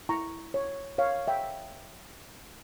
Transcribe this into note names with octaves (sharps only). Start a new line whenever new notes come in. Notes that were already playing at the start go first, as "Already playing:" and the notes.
E4 A#5 C#6
C#5
C#5 F5
E5 G5